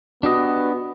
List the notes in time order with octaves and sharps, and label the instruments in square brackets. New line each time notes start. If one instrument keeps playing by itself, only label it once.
[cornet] B3 [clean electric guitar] D4 G4 D#5 [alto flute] F#4